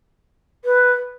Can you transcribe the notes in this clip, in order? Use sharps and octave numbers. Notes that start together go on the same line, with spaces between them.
B4